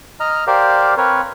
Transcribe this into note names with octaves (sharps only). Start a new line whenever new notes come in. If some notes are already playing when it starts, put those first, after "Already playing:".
D#5 A#5 F6
G4 A#4 C5 D5 F5
C4 A#4 B4 C#5